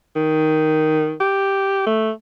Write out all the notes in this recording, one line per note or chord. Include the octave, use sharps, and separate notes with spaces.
D#3
G4
A3